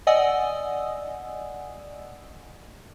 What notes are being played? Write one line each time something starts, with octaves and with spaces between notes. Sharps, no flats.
D5 D#5 F#5 G#5 D#6 E6